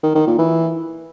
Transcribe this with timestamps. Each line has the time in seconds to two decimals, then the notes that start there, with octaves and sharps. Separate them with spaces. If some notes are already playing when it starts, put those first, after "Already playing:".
0.03 D#3
0.15 D#3
0.27 A#2
0.39 E3